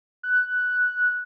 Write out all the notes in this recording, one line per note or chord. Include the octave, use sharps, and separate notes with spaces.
F#6